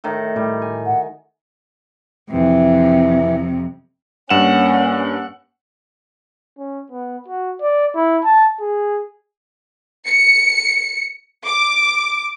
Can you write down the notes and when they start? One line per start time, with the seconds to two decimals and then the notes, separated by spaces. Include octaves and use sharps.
0.04 A2 D#3
0.36 A2 G3
0.62 G#5
0.86 F#5
2.30 F2 C3 E3
4.30 G2 A#3 C#4 F#5 E7
6.58 C#4
6.92 B3
7.28 F#4
7.62 D5
7.95 E4
8.24 A5
8.61 G#4
10.06 C#7
11.45 D6